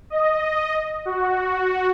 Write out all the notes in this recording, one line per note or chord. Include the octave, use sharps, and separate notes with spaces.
D#5
F#4